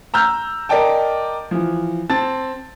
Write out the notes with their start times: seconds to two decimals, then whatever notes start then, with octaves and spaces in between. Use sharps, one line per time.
0.14 A#5 E6 F6 G6
0.69 A#4 D5 D#5 G5 A5
1.51 E3 F3
2.09 C4 A5 A6